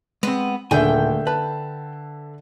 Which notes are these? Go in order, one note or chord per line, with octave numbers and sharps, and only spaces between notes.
G#3 B3 C4
D#1 D3 A3 G#4 E5 G5 G#5
B4 A5